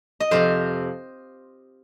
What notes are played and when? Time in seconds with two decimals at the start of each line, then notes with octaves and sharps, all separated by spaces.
0.20 D#5
0.31 F2 C3 F3 C5